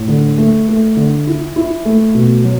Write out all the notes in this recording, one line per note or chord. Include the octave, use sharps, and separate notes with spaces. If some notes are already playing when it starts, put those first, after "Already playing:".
Already playing: A2
D3
A3
A3
D3
E4
E4
A3
B2
F#3